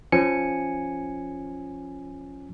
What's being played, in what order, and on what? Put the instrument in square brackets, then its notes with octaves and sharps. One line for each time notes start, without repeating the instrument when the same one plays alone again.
[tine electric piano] F3 C#4 G#5 C#7